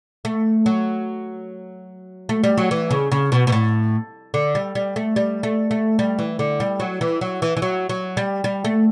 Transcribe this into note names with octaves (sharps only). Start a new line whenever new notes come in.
A3
F#3
A3
G3
F#3
E3
C#3
C#3
B2
B2
A2
D3
G3
G3
A3
G3
A3
A3
G3
E3
D3
G3
F#3
E3
F#3
E3
E3
F#3
F#3
G3
G3
A3